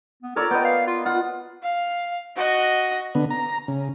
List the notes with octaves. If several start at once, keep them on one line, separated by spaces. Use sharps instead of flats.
B3
A4 A#4 C#5 D5
B3 D#5 G5
F5
F4
F4 F#5
F5
F#4 D#5
D3 B3
A#5
C#3